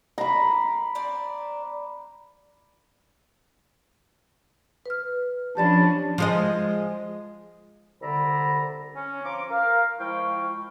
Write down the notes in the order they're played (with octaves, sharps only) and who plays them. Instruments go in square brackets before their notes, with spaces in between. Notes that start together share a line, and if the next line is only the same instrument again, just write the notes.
[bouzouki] A#3 [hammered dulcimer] A#5 B5
[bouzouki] C4 D4 D5
[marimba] B4 F6
[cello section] F3 C#4 D4 [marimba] G4 D5 B5 [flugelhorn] A5
[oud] F3 G#3 D#5
[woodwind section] C2 D3 D5 E5 A#5 B5
C#4
F3 A#5 C6 D6
A#4 F5
F3 G#3 E4 F5 G5 C#6